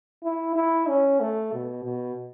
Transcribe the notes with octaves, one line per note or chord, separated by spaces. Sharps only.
E4
E4
C#4
A3
B2
B2